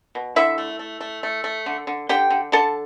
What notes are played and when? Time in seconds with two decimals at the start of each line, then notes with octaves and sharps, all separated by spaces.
0.15 B2
0.36 D3 E4 E5
0.58 A3
0.79 A3
1.01 A3
1.23 A3
1.44 A3
1.66 D3
1.87 D3
2.09 D3 G4 G5
2.30 D3
2.52 D3 A4 A5